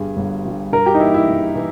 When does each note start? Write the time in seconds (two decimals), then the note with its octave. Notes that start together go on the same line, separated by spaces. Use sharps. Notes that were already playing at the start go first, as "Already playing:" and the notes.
Already playing: G1 G2 G3 G#4
0.17 G1
0.45 G2 G3
0.73 G2 A#4
0.86 G4
0.94 D#4
1.00 E3 A#3 E4
1.14 E4
1.28 G2
1.55 E3